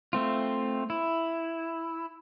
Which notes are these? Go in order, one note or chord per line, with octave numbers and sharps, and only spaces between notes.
A3 C4 F4
E4